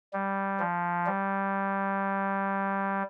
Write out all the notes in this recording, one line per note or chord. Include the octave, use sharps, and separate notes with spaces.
G3
F3
G3